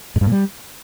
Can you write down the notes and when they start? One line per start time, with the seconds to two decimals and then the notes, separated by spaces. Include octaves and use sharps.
0.16 G#2
0.21 G2
0.26 A#2
0.32 G3